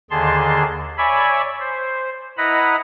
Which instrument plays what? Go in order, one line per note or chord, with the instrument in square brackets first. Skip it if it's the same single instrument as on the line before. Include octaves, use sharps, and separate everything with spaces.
[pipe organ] D#2 D3 D#3 G#4 A5 C6
C#5 D5 E5 G#5 B5
C5
E4 B4 D#5 F#5 A#5 B5